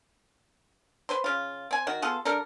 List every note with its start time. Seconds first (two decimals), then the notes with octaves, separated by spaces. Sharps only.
1.09 B4 C5 C6
1.24 C#3 F4
1.71 C4 G#5
1.87 D#3 F#4
2.02 B3 F4 G#4 A4
2.25 G3 D4 A4 A#4